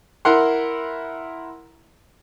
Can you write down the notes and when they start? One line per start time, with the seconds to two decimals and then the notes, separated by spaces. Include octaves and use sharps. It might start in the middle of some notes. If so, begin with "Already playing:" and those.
0.25 E4 A#4 F#5 C6